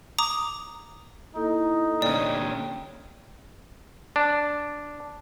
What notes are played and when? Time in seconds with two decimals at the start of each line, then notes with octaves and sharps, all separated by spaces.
0.18 A#5 D6 D#6
1.35 A#3 D#4 E4 A4
2.02 A#2 D3 C#4 D5 G5
4.16 D4